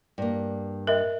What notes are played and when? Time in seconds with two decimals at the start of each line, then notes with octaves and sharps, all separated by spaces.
0.18 G2 A#3
0.87 A#4 D#5 E5 G5